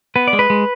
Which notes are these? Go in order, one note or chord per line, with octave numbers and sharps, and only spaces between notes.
B3 B4
D5
G#3
B4
G#3